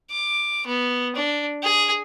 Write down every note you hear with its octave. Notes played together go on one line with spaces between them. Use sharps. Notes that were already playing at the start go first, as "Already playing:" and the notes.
D6
B3
D4
G#4